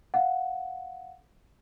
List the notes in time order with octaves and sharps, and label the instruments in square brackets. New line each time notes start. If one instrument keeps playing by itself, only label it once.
[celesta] F5 F#5